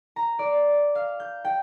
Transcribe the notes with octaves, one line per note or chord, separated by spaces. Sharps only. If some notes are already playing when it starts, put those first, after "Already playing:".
A#5
D5
F5
G6
G5